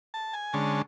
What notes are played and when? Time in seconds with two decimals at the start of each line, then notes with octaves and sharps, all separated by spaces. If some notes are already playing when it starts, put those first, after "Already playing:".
0.14 A5
0.33 G#5
0.53 D3 G#3 C#4 A5